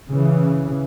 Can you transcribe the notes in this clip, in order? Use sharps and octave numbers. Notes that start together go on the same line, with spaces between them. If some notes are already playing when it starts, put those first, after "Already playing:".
C#3 E3